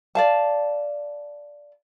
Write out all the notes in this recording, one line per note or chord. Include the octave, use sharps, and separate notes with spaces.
D5 F5 A5